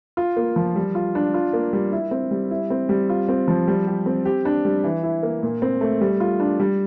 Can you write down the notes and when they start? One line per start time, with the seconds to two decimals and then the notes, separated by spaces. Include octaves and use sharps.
0.17 F4
0.37 A#3
0.56 F3
0.76 G3
0.95 F4
1.15 D4
1.34 F4
1.53 A#3
1.73 G3
1.92 E4
2.11 C4
2.31 G3
2.51 E4
2.70 C4
2.89 G3
3.09 F4
3.28 C4
3.48 F3
3.68 G3
3.87 G4
4.06 C4
4.25 G4
4.45 D4
4.65 G3
4.84 E3
5.03 E4
5.23 A#3
5.43 A#2
5.62 C4
5.81 A3
6.01 G3
6.20 F4
6.40 D4
6.60 G3